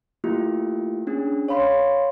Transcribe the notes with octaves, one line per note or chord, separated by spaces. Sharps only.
A3 A#3 E4 F4 G4
C#4 D4 G#4
C#5 F5 B5 C6